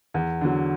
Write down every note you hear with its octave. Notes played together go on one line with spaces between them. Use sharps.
E2
D3 F#3